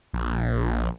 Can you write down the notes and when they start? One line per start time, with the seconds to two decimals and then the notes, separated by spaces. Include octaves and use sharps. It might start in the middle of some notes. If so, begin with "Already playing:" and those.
0.14 A#1